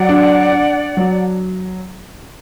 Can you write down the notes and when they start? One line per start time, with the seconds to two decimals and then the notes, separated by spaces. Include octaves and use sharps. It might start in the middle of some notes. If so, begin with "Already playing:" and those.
Already playing: F#3 D5 F#5
0.09 D4
0.52 D4
0.97 F#3